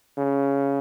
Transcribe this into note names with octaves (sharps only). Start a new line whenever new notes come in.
C#3